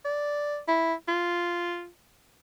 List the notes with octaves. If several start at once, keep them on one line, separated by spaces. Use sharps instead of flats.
D5
E4
F4